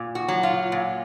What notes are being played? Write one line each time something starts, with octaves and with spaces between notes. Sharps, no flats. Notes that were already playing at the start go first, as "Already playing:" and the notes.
Already playing: A#2
F#4
F#3
F4
A#2